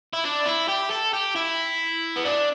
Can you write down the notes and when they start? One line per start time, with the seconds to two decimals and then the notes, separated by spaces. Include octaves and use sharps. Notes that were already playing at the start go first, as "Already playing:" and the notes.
0.13 E4
0.24 D4
0.46 E4
0.69 G4
0.91 A4
1.13 G4
1.36 E4
2.16 B3
2.25 D4